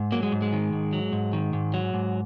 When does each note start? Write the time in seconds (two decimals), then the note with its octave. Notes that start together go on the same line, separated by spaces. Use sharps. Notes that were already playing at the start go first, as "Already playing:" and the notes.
Already playing: G#2
0.12 F#3 A#3
0.23 G#3
0.32 G#2
0.42 G#3
0.53 D#3
0.73 G#2
0.93 F#3
1.13 G#2
1.33 D#3
1.53 G#2
1.74 F#3
1.94 G#2